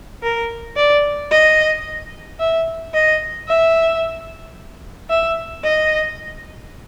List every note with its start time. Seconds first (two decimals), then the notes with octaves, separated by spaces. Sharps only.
0.23 A#4
0.76 D5
1.31 D#5
2.39 E5
2.94 D#5
3.48 E5
5.10 E5
5.64 D#5